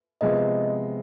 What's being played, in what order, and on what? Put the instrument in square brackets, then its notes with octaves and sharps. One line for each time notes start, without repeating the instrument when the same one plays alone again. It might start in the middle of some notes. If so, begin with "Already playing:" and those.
[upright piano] C3 F3 G#3 B3 [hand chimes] D#5